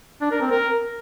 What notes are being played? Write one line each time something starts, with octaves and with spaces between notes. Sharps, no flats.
D4
A#4
C4
A#4